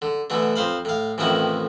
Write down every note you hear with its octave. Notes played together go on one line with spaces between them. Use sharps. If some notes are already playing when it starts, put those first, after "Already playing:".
D3
B2 D3 E3 A3
F2 C5 F5 B5
A2 F5
A1 F2 A2 D#3 E4 F#4